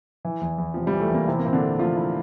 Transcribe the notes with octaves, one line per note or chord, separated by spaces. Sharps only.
E3
E2
E2
C3 F3
G3
E3
A3
E2 A#3
C3 C4 E4
A#3
A#2 C4
D3 D4
A4
F3 A3 F4
E4